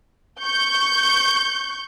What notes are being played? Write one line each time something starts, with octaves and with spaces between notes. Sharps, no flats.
C#6 G6